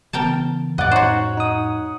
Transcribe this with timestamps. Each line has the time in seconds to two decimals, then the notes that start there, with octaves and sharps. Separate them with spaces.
0.13 C#3 E3 B3 A#4 G5 A5
0.78 F2 A2 D5 D#5 F#5
0.91 D#4 F#4 C5 C#5
1.38 D#4 D#6